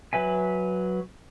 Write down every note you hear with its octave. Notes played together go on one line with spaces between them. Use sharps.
F#3 B4 E5 G#5